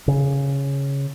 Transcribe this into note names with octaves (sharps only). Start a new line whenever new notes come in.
C#3